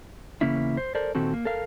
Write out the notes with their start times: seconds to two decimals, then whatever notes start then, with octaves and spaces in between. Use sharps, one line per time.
0.41 E2 C#3 A#3 C#4 E4
0.77 C5
0.95 A4 A#4 C5 D5
1.15 A#2 D#3 C4 F#4 A4
1.34 A#3
1.45 A4 A#4 F5